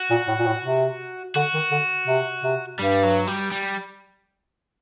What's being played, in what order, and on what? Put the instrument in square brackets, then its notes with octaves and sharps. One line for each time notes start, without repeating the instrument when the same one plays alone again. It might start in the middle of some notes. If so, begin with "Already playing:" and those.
Already playing: [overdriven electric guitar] F#4
[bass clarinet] A#2
A2
A#2
A2
C3
[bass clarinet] D3 [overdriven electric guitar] F#4
[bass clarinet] D#3
D3
C3
C3
[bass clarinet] G2 [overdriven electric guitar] G3
[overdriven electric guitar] F#3
G3
G3